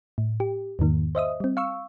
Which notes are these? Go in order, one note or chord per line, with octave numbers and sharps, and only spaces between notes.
A2
G4
E2 G#2 D#3 A#3
C5 D#5 E5 D#6
G3 C4
F5 C#6 E6